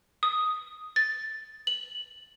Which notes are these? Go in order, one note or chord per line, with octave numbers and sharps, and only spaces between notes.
D#6
A6
F#7